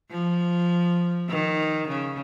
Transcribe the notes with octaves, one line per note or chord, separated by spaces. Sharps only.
F3
D#3
C#3